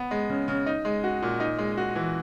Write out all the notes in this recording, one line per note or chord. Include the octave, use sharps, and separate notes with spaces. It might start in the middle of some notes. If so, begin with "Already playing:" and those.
Already playing: B3
G#3
C#3
C#3
D#4
G#3
F#4
A#2
D#4
G#3
F#4
E3